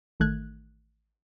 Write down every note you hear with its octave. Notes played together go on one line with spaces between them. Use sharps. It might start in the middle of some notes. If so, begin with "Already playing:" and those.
A1 D#3 A3 F#6 G#6